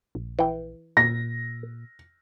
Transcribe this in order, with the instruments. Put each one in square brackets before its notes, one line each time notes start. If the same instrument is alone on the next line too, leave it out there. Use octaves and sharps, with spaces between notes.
[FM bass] A#1
[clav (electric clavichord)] E3 G5
[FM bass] A#2 [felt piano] A#6